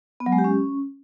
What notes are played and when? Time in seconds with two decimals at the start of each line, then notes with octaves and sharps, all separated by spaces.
0.20 B3
0.26 F#3
0.32 G#3
0.38 G4
0.44 C#4